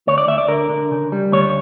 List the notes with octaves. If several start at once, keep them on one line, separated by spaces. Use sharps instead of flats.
D2 C#5
D5
D2 E5
D5
D3 A#4
D3
C#3
G3
D2 C#5